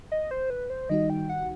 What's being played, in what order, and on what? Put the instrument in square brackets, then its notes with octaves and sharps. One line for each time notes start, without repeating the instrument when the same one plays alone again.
[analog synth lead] D#5
C5
B4
C5
[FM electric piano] D#3 G3 D#4 F#4 [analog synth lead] D#5
[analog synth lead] G5
F#5